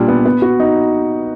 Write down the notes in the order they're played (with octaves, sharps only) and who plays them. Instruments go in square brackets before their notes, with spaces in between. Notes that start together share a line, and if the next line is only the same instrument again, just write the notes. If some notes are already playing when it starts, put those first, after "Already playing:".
Already playing: [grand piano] A#2 G3 D4
B3
B3
F#4
D#4